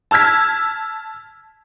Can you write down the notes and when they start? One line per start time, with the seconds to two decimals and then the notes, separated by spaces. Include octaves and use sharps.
0.11 A5 E6 F6 G#6 B6